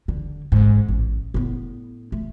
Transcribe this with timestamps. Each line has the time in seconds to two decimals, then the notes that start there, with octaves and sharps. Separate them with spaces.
0.08 D3
0.52 A1 G#2
0.88 A1
1.34 A2 B3
2.12 A3